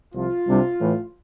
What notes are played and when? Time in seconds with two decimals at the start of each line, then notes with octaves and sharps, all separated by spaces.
0.14 C2 C3 F3 F4
0.48 C2 C3 G3 D4
0.80 A2 E3 A3